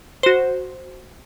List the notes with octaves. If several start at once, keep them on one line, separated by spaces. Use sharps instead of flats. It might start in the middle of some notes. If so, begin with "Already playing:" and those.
F#4 C5